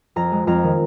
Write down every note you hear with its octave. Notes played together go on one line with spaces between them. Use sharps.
F2 A#5
G#3
F2 A#5
D#3